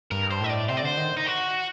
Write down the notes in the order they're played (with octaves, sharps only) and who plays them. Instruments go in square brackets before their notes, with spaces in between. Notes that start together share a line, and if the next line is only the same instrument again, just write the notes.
[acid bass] G2 [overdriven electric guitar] A#4
[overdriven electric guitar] C5
[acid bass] A2 [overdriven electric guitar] D#5
[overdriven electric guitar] D5
[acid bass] C3 [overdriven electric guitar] C5
[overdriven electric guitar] D5
[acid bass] D3 [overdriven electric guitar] C5
[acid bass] D#3
[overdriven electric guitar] D#4
F#4